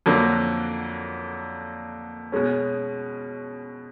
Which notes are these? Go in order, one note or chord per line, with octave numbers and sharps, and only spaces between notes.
F2 D3 F#3 A#3
B2 G#3 C#4